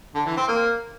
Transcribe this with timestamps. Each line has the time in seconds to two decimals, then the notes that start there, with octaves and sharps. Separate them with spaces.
0.15 D3
0.26 E3
0.37 C4
0.48 A#3